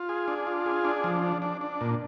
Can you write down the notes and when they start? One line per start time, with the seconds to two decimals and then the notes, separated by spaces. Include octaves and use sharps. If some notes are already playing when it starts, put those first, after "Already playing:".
Already playing: F4
0.09 G#4
0.28 D4
0.47 F4
0.66 G#4
0.85 D4
1.04 F3
1.23 D4
1.42 D4
1.61 D4
1.81 A#2